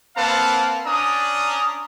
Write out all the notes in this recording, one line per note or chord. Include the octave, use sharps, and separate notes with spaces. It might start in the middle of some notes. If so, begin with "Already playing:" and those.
A#3 C4 B4 F5 F#5 A5
C#4 D4 D5 A#5 D#6